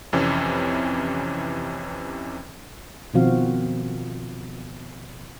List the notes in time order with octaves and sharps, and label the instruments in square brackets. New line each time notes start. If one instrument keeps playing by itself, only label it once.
[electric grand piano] F2 C3 E3 C#4
[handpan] B2 D#3 F3 C4 F#4 F5